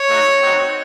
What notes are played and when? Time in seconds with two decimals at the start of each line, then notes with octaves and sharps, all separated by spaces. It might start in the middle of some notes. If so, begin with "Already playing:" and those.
Already playing: C#5
0.09 A3 D#4 F#4
0.41 C4 D#4 F#4